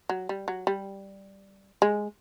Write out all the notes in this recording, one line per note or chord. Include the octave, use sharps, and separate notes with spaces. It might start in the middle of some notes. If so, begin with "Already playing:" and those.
F#3
G3
F#3
G3
G#3